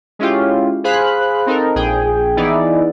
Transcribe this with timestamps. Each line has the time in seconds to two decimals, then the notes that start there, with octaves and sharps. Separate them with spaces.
0.19 G#3 C#4 E4 F4 G4
0.84 G#4 C5 F5 B5 F#6
1.46 C4 D#4 A4 A#4
1.75 A#1 G#4 G5
2.37 E3 B3 D#4 E4 G#4 D5